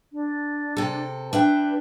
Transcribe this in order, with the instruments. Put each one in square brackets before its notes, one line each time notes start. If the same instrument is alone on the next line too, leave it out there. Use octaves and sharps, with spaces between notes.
[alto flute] D4
[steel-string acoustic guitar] C3 A4
[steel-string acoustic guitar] D4 E5 G5 [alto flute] B4